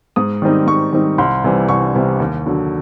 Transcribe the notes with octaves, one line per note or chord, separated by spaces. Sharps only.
G#2 D#6
D#3 G3 C4 D#4
G#2 C#6
D#3 G3 C4 D#4
C2 C6
C3 E3 G3
C2 C#6
C3 E3 G3
D#2
D3 F#3